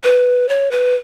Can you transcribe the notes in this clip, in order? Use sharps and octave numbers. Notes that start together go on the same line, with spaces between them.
B4
C#5
B4